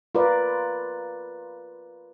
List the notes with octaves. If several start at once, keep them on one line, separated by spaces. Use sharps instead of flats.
F4 A#4 B4 D5